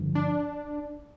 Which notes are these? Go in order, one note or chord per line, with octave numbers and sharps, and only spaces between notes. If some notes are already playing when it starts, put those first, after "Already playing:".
Already playing: G2 D3 F3 C4
D4